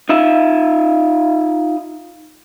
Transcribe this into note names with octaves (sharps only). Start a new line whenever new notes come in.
D#4 F4 E5